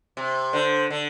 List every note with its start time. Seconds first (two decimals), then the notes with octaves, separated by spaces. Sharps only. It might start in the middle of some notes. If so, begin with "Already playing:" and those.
0.17 C3
0.53 D3 C5
0.90 D3